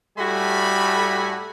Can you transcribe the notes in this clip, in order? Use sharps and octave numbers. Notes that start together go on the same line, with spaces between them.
A2 G3 A3 F#4 G#5 B5